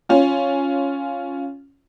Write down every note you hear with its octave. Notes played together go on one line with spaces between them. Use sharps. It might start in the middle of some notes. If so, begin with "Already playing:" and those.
C#4 F4